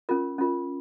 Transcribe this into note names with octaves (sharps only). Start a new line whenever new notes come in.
C#4 F4 A#4
C#4 F4 A#4